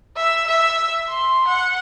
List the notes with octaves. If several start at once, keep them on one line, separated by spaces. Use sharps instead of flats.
E5
E5
C6
F#5